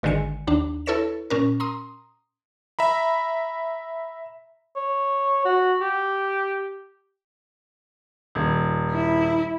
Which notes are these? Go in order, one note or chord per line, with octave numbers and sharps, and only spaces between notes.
G#1 D3 D#3 G#3 G#5 C#7
D#2 D4
E4 A4 B4 C#5 A#6 E7
A#2 C#4 A#4
A#5 C6 D#6
E5 A#5 B5
C#5
F#4
G4
D#1
E4